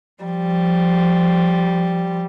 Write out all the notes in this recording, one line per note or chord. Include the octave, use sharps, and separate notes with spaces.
F3 G3